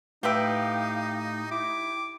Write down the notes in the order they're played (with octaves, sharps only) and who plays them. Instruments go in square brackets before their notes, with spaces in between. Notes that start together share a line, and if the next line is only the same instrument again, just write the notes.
[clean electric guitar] A2 G5 [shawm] D#4 [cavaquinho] G4 B4 E5 [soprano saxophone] F5
[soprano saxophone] E4 [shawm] D6